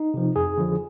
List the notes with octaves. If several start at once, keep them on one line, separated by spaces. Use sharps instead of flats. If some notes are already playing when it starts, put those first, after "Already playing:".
Already playing: D#4
C3 F3
F2 G#4
D3 F3